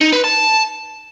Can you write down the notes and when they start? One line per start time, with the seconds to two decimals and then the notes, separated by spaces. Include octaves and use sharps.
0.01 D#4
0.12 B4
0.24 A5